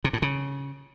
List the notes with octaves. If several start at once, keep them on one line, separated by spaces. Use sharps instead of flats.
C3
A2
C#3